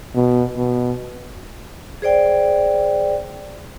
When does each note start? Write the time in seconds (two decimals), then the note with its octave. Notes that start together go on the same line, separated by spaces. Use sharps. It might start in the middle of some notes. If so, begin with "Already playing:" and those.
0.15 B2
0.57 B2
2.02 G#4 C5 D5 G5